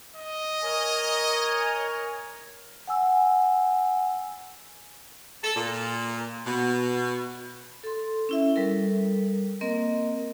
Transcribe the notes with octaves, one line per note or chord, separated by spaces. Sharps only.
D#5
A#4 C#5 G#5
F#5 G#5 E6
A4
A#2
B2
A4 C6
C#4 E4 E5
G3 A4 A#4
A#3 C4 A#4 D#5